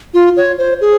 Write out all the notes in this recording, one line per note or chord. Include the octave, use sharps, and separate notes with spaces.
F4
C#5
C5
G#4